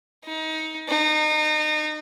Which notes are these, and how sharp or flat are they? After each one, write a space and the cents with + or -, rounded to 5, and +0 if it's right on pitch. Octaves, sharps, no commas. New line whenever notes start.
D#4 +25
D#4 -30